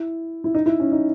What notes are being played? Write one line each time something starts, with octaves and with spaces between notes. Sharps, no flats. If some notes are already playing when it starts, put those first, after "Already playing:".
Already playing: E4
E4
D#4
E4
C#4
D#4